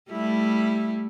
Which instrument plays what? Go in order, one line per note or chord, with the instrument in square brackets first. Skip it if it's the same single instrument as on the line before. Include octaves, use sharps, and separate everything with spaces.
[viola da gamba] G3 A3 E4